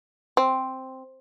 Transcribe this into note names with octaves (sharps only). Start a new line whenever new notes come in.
C4